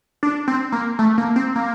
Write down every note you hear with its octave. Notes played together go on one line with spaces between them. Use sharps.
D4
C4
A#3
A3
A#3
C4
A#3